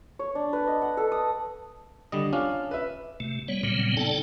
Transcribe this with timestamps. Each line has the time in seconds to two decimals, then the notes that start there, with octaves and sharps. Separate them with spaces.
0.19 C#5
0.35 D4
0.53 B4
0.67 D#5
0.82 F#5
0.97 A4
1.12 D#6
2.12 D3 G3 D#5
2.33 C#4 D4 F4 F5
2.71 B4 E5
3.20 C3 A3
3.48 G3 B3 C#5
3.63 A#2 C#3 F#3 G3 B3 C4
3.97 C#3 D#4 A4 D5 G5 A5